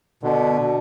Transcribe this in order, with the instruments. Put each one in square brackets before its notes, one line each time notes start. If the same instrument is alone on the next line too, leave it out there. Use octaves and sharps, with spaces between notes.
[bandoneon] B2 [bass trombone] D3